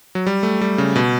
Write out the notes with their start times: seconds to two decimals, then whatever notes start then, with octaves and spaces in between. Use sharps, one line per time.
0.15 F#3
0.27 G3
0.43 A3
0.61 G3
0.78 C#3
0.96 B2